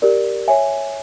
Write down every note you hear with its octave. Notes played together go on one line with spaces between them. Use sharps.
G4 A#4 D5
C#5 E5 G#5